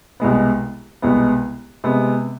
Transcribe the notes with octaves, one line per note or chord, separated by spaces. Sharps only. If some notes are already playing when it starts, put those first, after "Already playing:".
C2 B2 G#3 B3
C2 B2 G#3 B3
C3 G#3 B3